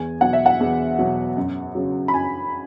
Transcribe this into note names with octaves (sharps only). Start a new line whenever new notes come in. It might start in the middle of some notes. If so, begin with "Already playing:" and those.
Already playing: E2 G#5
B2 F#3 F#5
E5
F#5
E2
B2 F#3
F#2
C#3 F#3
B5
F#2 G#5